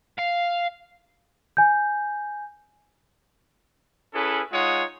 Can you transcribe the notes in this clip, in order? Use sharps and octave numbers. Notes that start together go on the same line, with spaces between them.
F5
G#5 G6
C#4 E4 G#4 A4 B4
G#3 D#4 F4 C#5 F#5 D#6